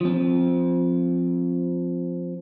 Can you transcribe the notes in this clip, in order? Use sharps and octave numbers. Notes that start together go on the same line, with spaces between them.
F3 C4